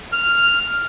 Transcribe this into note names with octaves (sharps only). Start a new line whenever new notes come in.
F6